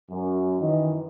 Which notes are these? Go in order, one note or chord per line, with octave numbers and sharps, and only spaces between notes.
F#2
D#3 E3 D#5